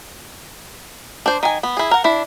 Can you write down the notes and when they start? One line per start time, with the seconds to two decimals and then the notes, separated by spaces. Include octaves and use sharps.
1.26 D4 C5
1.43 D#3 G#5
1.63 B3
1.77 E4 G#4
1.91 A#4 F#5
2.04 D4 E4